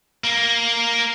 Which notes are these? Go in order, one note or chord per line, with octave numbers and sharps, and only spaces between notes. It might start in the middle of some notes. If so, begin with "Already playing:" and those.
A#3